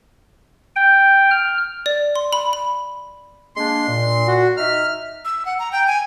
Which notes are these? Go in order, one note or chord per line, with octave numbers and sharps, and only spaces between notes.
G5
F6
D5
C6
B5
B5
G#3 A#3 D4 C6
A#2
F#4
D#4 E5 F6
E6
F#5
A#5
G5
G#5